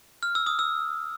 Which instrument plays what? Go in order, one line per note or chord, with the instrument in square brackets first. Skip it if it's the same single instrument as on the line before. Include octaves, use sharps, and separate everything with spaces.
[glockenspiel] F6
E6
D#6
E6